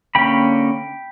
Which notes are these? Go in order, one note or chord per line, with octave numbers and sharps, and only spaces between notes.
D3 A#3 C#4 G5 B5